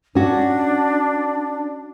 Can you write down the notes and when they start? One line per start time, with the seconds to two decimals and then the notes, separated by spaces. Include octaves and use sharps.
0.15 C#4 D4 F#4